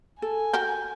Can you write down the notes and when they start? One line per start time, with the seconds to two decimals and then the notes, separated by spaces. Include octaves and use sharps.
0.22 A4 G#5
0.53 F#4 G4 A#4 G6